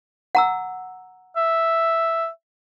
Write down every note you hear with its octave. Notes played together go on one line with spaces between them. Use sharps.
F#5 A#5 E6
E5